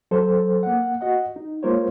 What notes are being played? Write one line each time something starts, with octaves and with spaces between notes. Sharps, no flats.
F#3 A4 C5
A#3 F#5
F#4 D#5 F#5
D#4
G#3 A#3 F4 A#4 C5 C#5